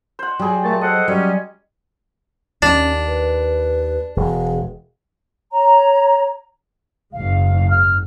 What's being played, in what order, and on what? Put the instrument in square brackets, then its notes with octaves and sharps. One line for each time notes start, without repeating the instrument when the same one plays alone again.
[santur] C5 F#5
[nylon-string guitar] F#3 [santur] G3 G#4
[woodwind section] A#2 A3 A5
[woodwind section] A4 C5 F#5 [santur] D#5
[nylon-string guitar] F#3 [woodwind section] G3 C#4
[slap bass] D#2 [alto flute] C#4 [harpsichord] D4
[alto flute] B4
[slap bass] E1 [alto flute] G#4
[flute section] C#5 A#5
[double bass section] F#1 G#2 [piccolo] F5
[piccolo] F6